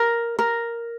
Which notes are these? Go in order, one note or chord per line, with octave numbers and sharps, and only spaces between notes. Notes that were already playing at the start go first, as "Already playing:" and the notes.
Already playing: A#4
A#4